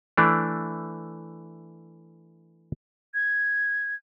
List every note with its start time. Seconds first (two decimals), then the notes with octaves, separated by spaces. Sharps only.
0.17 E3 A3 D4
3.14 G#6